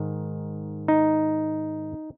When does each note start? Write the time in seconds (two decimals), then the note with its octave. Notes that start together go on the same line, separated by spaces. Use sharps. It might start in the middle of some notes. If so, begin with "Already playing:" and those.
Already playing: G#2 D#3
0.88 D#4